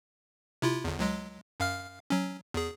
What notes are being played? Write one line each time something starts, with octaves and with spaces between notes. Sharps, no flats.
C3 E4 F4
G1 E2
C#2 F#3 G#3
F#2 F5 F6
F#3 C#4
E2 G#4